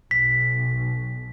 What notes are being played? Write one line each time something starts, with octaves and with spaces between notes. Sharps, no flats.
B1 B6